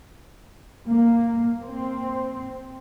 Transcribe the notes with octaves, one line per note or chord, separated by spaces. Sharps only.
A#3
C4